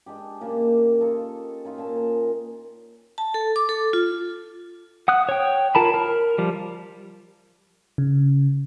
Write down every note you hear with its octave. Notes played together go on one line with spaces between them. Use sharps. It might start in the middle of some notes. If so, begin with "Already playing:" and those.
G#3 D4 G4
A#2 C#3 A#3 A5
C#4 D#4 F4 A4
C#4 D#4 F4
A#2 A5
A#4
A5
A4
D6
A4
F4
F#5 D#6 F#6
C#5 G5
F4 A#4 A5 B5
A#4
F3 G3
C#3